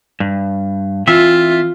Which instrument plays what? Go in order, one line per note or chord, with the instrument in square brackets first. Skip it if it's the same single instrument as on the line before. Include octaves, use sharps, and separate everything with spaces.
[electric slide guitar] G2
[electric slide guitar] E3 C4 E5 [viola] F4